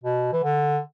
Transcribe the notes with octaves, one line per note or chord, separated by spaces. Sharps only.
B2
E3
D3